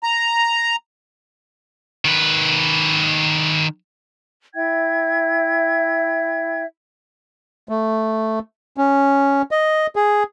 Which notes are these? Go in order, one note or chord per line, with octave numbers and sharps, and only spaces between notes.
A#5
D#3 B4
E4 E5 G5 G#6
A3
C#4
D#5
G#4